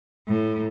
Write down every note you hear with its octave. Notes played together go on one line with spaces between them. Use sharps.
A2